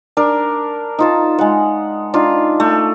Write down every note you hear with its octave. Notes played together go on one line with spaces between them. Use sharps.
D4 A#4
D#4 F4 A5
G#3 F#5
D4 D#4 F4
A3